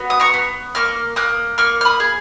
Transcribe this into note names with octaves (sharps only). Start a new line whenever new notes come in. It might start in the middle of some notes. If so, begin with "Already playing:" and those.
Already playing: B3 F#4
D#6
A#5 C#6
B3
A#3 C#6 F6
A#3 D#6 F#6
A#3 C#6 F6
F6
B5 D#6
G#4